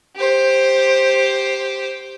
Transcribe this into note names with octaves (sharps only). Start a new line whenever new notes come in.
G4 C5